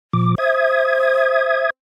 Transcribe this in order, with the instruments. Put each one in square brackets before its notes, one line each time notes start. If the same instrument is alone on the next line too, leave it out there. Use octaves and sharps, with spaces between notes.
[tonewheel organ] A#2 F3 D6
[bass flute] C5 [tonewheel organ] E5 D#6 G#6